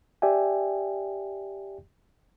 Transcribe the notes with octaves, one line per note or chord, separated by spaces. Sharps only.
G4 D5 E5 G5 G#5